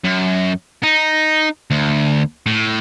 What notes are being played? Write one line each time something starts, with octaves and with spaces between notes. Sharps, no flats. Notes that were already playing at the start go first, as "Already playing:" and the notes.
F#2
D#4
D2
A2